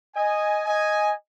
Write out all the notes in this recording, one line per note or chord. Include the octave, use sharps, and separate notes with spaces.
D#5 G#5
D#5 G#5